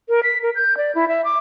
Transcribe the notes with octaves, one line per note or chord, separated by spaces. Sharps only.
A#4
B6
A#4
G6
D5
E4
E5
D6